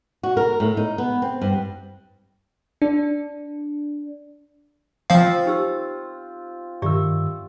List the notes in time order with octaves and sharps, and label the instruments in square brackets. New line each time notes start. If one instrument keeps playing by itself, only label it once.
[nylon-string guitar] F#4
A#4
A2
D#4
B3
C4
G2
[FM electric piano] D4
[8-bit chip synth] F3 F5 [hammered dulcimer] C4 F4
[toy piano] D#4 G4 E6
[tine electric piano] G2 D#3 E6 [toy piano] G4 D5 E5